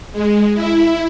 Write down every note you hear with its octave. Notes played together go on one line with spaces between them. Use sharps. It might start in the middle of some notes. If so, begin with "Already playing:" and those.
G#3
E4